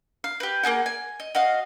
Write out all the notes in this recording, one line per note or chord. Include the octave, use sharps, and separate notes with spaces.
F5
G4 B4
A#3 C4 G#4 F#5
G#5
D#5
F#4 D#5 F5